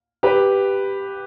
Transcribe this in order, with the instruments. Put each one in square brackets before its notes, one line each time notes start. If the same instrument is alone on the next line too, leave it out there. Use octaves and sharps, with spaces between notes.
[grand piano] G4 B4